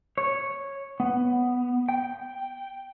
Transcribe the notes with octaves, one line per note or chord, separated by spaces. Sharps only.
C#5
B3
G5